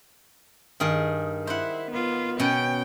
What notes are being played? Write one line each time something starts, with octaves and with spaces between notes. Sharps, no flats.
G2 D#3 G#4
E4 C5 F#5
B3 F4
B2 C#4 G5